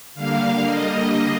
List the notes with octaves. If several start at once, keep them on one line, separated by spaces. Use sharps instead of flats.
D3 G3 A#3 F5
D#5